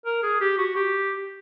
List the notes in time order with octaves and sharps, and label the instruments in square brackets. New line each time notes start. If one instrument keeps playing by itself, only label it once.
[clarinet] A#4
G#4
G4
F#4
G4